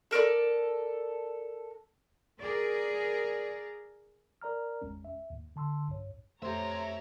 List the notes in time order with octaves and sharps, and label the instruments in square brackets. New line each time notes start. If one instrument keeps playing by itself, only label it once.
[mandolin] A4 A#4 C5 D5
[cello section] G#4 A#4 D5
[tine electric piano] A#4 D5 A#5 F6
G#1 E2 G#3 C#4
E5
D#2 G#2
D3 A5 C6 E6
B1 G2 C#5
[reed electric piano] F2 G4 [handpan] A3 C5 [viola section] C#5 A#5 [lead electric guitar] E5 C6